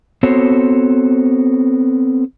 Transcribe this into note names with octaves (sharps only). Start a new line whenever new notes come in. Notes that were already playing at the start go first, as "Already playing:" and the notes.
B3 C4 F#4 A4 C5 C#5